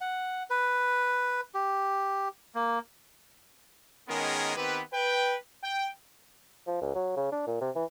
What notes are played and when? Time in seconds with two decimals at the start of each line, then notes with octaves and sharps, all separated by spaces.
0.01 F#5
0.50 B4
1.55 G4
2.55 A#3
4.09 D#3 G#3 B3 C#4 G#4 A#4
4.56 D#3 B3 C4 G4 B4
4.93 B4 G5
5.63 G5
6.67 F3
6.82 C#2
6.95 F#3
7.17 C#3
7.32 D4
7.47 A#2
7.61 C3
7.75 E3